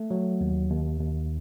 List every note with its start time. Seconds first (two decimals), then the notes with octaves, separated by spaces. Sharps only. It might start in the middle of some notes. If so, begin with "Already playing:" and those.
Already playing: A3
0.11 F#3
0.41 D#2
0.70 D#2
1.00 D#2